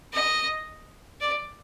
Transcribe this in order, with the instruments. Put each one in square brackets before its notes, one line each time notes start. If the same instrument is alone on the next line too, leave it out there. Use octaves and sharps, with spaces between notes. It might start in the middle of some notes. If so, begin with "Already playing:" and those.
[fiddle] D#5
D5